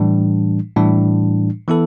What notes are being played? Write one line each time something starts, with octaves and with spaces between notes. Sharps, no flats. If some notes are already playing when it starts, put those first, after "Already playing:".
Already playing: A2 E3 G3 D4
A2 E3 G3 D4
E3 B3 E4 A4